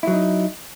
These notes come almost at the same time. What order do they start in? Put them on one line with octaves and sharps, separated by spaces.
E4 F#3 D#4